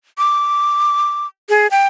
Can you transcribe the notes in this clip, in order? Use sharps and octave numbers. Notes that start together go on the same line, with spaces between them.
D6
G#4
G5